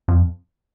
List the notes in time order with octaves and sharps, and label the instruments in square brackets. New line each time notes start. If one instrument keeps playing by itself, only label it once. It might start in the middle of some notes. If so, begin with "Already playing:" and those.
[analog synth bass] F2